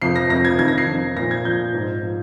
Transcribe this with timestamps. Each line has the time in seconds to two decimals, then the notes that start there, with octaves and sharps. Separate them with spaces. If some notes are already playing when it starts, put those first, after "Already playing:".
0.02 F2 C3 F3 C7
0.16 A#6
0.30 F2 C3 F3 A#6
0.45 G#6
0.59 F2 D#3 G#6
0.68 A#6
0.78 C7
0.88 F2 D#3
1.16 A#2 F3 A#6
1.31 G#6
1.45 A#2 F3 G6
1.74 G#2 F3
2.03 F3